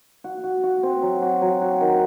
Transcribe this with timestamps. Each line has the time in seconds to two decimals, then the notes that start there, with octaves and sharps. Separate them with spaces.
0.24 F#4
0.44 F#4
0.63 F#4
0.83 C4
1.02 F#3
1.22 F#4
1.42 F#3
1.61 F#4
1.81 D#3